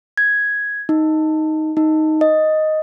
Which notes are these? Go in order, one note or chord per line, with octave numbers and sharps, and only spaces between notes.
G#6
D#4
D#4
D#5